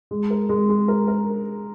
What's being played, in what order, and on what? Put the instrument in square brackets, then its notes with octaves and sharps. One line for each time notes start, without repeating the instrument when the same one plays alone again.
[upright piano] G#3
A#4
G#3
G#3
A#4
A#4